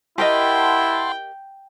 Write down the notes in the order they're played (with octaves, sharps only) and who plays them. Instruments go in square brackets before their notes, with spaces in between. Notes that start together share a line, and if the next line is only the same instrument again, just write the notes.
[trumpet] E4 [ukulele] G4 A#4 D#5 [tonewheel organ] F#5 A5 C6 [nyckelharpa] G5